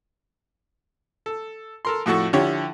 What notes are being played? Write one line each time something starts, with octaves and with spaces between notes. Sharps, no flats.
A4
A4 A#4 C6
F2 A2 F#4 A4 C#6
D3 F3 E4 G4 C#5 C#6